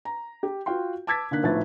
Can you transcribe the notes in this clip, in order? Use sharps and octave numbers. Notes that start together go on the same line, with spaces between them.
A#5
G4
F4 F#4 F5 G5 C6
A5 D6 E6 G#6 A6 B6
D3 A#3 D#4 F#6 B6
A#1 A2 A3 B3 D#4 A6